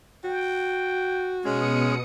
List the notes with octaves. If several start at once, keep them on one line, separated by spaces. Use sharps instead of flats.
F#4 G5
B2 G#3 C#4 D#6 C#7